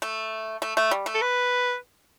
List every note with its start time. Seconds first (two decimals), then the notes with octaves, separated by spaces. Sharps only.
0.02 A3
0.62 A3
0.77 A3
0.91 G3
1.06 A3
1.15 A4
1.22 B4